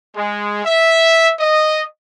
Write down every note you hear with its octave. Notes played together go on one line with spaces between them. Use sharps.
G#3
E5
D#5